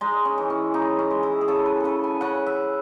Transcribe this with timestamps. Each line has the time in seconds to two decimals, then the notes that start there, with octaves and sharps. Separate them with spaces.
0.01 G#3 D#4
0.25 C#4
0.38 E3
0.50 C#4
0.74 C#3 D#4
0.99 C#4
1.11 G#3
1.23 E4
1.41 G#4
1.48 C#3 A4
1.66 B4
1.80 C#3 A4 B4
2.04 G#5
2.21 C#3 F#5
2.46 E5